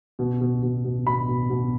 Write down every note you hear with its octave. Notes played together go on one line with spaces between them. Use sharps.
B2
B2
B2
B2
B2 B5
B2
B2